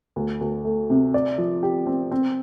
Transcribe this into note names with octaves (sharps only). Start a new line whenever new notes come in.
D2
D2
A3
C3
D5
F3
G4
C4
C4